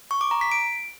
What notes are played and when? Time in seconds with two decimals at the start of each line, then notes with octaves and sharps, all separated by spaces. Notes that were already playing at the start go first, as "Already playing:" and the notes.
0.11 C#6
0.21 D6
0.31 A#5
0.41 B6
0.52 D7